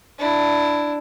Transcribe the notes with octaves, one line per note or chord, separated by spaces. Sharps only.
D4 E4